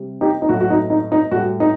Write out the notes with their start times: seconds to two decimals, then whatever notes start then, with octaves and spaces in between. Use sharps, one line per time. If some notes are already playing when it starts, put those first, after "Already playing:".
Already playing: C3 G3
0.21 D#4 G4
0.42 D#4
0.49 A2 F#3 F#4
0.60 F#4
0.70 D#4
0.90 D#4
1.12 D#4
1.31 A2 G3 F#4
1.60 D#4